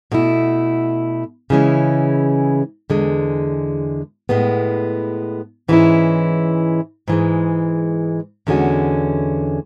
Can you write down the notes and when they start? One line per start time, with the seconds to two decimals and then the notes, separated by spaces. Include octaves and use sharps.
0.12 B2 A3 E4
1.50 C#3 E3 G#3 C#4 E4
2.90 E2 D3 G#3
4.29 A2 G#3 B3
5.68 G#2 E3 G#3 C#4 E4
7.08 G#2 E3 G#3
8.47 E2 D3 G#3 C#4 F#4